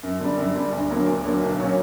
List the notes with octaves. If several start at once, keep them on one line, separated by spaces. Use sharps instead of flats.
F#2
D3 G3
F#2
D3 G3
D2
D3 F#3 A#3
D2
D3 F#3 A#3
B1
A#2 F#3 C#4